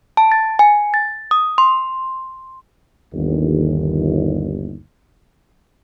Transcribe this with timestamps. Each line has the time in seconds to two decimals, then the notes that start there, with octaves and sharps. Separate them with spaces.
0.17 A5
0.32 A6
0.59 G#5
0.94 A6
1.31 D#6
1.58 C6
3.13 G1 D#2